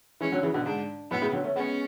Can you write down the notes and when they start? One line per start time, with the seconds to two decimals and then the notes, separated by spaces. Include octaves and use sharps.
0.20 E3 G#3 C#4
0.32 D3 F#3
0.43 C#3 E3
0.54 B2 D3
0.65 G#2 D4
1.11 F#2 A2 B3
1.22 A2 C#3
1.33 D3 F#3
1.44 A3 C#4
1.56 G#3 B3 C#4